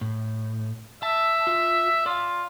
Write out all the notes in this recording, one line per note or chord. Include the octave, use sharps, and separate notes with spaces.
A2
E5 A5
F4
F4 D5 F5